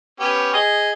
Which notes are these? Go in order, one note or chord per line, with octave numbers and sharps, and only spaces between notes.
B3 C#4 G4
G#4 D#5